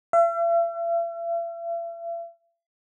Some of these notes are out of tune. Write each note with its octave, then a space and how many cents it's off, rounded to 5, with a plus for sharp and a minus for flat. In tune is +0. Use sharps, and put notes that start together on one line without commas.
E5 +45